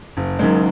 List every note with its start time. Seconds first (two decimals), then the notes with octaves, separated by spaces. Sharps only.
0.17 F#1
0.39 F#2 D#3 G#3